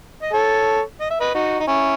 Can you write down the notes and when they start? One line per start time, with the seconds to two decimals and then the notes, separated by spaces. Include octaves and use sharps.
0.22 D#5
0.33 A4 C#5
1.01 D#5
1.10 E5
1.20 B4 D#5
1.35 D#4 F#4
1.60 D#4
1.67 C#4 E4